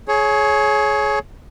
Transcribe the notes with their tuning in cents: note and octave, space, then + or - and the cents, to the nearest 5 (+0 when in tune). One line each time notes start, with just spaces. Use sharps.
G#4 +30 C#5 +0